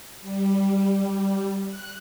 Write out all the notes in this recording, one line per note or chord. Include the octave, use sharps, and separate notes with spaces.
G3
F#6